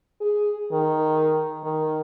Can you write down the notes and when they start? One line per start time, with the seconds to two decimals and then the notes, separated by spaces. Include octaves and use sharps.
0.21 G#4
0.72 D#3
1.64 D#3